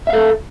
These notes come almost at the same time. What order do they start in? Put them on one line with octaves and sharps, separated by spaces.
E5 F5 A4